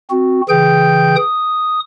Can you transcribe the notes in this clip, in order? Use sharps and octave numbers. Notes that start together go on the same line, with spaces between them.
C4 F#4
C#3 E3 G#4 G5 G6
D#6